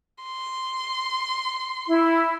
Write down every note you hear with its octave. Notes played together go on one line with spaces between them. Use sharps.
C6
E4